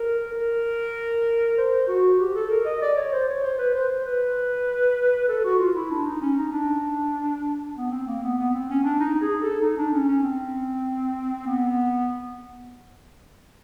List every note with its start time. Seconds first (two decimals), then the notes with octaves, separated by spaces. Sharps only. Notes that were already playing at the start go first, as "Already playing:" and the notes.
Already playing: A#4
0.33 A#4
1.58 C5
1.88 F#4
2.20 G4
2.35 A4
2.51 A#4
2.65 D#5
2.82 D5
2.97 C#5
3.12 C5
3.28 C#5
3.44 C5
3.59 B4
3.74 C5
3.89 C5
4.06 B4
5.29 A4
5.44 F#4
5.59 F4
5.75 E4
5.91 D4
6.06 D#4
6.21 C#4
6.38 D#4
6.52 D4
7.77 B3
7.91 C4
8.07 A#3
8.23 B3
8.39 B3
8.54 C4
8.70 C#4
8.84 D4
9.00 D#4
9.21 G#4
9.42 A4
9.61 D#4
9.77 D4
9.93 C#4
10.08 C#4
10.23 C4
11.47 B3